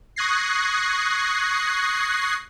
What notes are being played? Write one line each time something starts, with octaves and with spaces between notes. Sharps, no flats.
C#6 D#6 F#6 G#6 A#6 C7